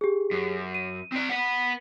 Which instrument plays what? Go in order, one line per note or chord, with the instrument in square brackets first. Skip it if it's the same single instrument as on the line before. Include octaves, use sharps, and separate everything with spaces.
[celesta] G4 G#4
[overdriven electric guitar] F#2
[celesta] D#7
[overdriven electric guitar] C4 D5
B4 F#5